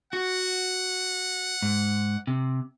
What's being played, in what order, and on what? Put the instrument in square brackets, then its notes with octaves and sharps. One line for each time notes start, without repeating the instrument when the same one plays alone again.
[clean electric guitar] F#4 [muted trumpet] F#5
[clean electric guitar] G#2
C3